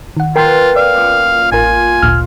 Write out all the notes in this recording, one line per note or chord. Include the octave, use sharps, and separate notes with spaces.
D#3 F#5
B2 F4 A#4 G5 C6
D5 F5
F#2 A#2
A1 F4 A#4 G#5
G#1 D2 A#2 F6